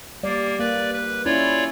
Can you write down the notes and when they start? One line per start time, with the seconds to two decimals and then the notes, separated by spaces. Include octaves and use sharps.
0.23 G3 A#3 D5
0.59 A#3 B4 D5
0.93 B4
1.25 C#4 E4 F4 C#5 D5